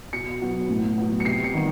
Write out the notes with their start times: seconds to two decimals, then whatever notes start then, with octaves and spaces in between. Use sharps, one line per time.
0.13 B2 C#7
0.41 F#3 B3
0.69 A2
0.98 F#3 B3
1.20 C#7
1.25 C3 C7
1.44 C#7
1.54 D#3 G3 B3